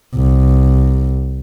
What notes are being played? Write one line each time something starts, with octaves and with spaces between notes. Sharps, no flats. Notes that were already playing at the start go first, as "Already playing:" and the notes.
C2